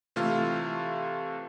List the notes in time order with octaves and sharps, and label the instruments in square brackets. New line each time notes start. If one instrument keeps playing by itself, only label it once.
[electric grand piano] C3 E3 A3 F4 F6